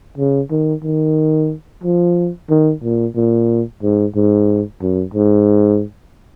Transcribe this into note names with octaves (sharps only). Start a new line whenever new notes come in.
C#3
D#3
D#3
F3
D#3
A#2
A#2
G#2
G#2
F#2
G#2